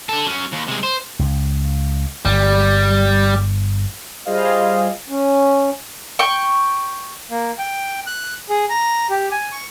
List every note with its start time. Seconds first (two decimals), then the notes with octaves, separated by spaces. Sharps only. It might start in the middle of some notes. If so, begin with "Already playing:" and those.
0.09 D4 A4
0.27 F#3 C#4
0.53 D#2
0.68 C3 G#3
0.84 C5
1.19 C#2
2.25 G1 G3
4.25 G3 F4 G#4 C5 D#5 F5
5.09 C#4
6.19 G5 C#6
7.31 A#3
7.59 G5
8.07 F#6
8.49 G#4
8.70 A#5
9.10 G4
9.32 G#5
9.52 C#6